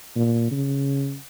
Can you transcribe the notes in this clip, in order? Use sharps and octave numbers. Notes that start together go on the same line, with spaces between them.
A#2
C#3